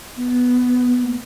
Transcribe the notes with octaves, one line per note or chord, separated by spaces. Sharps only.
B3
A#3